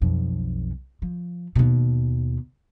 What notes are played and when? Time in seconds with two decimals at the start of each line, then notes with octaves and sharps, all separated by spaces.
0.01 B1 F2
1.02 F3
1.55 D#2 B2